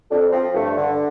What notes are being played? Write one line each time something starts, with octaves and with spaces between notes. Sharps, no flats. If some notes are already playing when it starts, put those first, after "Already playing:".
F2 D4
F3 C4
G2 A3
D3